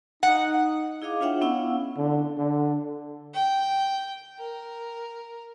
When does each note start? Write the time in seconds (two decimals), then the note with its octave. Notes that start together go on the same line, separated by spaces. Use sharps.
0.23 D#4 F#5
1.02 E4 G#4 D#5 F5 D6
1.21 D4 F4 C#5 E5 F#5 G5
1.41 B3 C#4 E4 F5 F#5 E6
1.97 D3
2.38 D3
3.34 G5
4.39 A#4